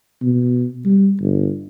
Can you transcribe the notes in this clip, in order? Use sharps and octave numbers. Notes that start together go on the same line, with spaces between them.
B2
G3
G1